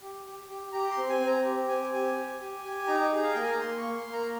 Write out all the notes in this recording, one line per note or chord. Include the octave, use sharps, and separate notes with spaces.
G4
G4
G4
G4 A#5
C6
C4
G#5
C4
A#5
G4
C4 G#5
G4 G#5
G4
G4
G4
D#4 A#5
G#4
F5
A#3 G5
G#5
A#5
A#3 C6
C#6
A#3
C6
A#3
A#5